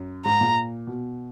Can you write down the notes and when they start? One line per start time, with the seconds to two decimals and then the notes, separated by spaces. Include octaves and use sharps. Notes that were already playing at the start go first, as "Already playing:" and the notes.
Already playing: F#2
0.25 G#2 A#5
0.41 A#2
0.87 B2